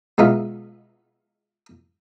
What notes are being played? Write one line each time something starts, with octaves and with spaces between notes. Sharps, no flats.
B2 G#3 D#4 F4 E5